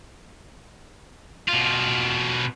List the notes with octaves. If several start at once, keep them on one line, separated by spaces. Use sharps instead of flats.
B2 F4